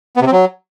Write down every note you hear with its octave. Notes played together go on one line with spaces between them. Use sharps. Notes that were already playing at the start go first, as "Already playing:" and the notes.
B3
C3
C4
F#3